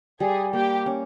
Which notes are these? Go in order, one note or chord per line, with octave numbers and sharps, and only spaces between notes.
G3 G#4
A#3 G4
C#4